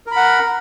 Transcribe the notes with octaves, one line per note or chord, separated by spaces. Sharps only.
A#4 F#5 B5